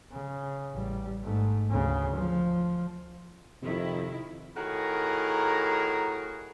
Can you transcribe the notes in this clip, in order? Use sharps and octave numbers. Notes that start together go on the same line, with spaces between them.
C#3
A1 G3
G#2 A3
D2 C#3
F3
F2 C3 D#3 E4
A2 D#3 F#4 G#4 A#4 A#5